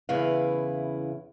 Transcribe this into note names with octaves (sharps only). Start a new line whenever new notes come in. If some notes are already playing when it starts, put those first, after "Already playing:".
E2 C#3 E4 B4 F5